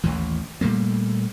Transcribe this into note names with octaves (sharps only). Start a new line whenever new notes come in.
A1 D#2 E3
A#2 G3 A3 A#3